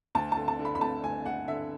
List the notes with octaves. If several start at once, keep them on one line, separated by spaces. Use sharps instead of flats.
D2 A5
D3 A5
A5
D3
B5
B5
A3 A5
D2 G#5
A3 F#5
D3 E5